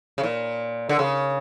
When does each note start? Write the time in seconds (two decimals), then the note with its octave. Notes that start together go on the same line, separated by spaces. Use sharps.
0.18 C#3
0.23 A#2
0.89 D3
0.99 C#3